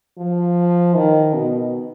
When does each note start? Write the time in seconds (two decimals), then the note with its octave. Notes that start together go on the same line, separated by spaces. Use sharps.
0.18 F3
0.95 D#3
1.34 B2